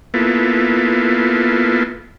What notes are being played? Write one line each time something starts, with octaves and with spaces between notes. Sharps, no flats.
A#3 B3 E4 F4 A4